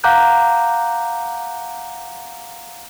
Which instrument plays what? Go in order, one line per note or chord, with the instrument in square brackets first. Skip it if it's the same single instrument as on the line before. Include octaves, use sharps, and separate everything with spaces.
[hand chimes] F5 F#5 A#5 D6 F#6 G6